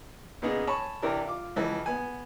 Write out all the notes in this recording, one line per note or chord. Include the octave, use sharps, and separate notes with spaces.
A#2 C#3 B3 D#4 G#4
C#5 G#5 A5 B5 C#6
C3 E3 D4 G4 A#4
F4 D6
C#2 E3 F3
B3 G#5